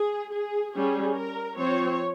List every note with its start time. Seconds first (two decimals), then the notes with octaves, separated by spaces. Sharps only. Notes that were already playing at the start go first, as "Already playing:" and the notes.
Already playing: G#4
0.32 G#4
0.74 G3 C#4 G#4
1.17 A#4
1.59 F3 C4 C#5